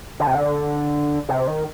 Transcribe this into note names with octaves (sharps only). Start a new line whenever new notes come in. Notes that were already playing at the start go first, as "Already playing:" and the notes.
D3
C3
D3
C3
D#3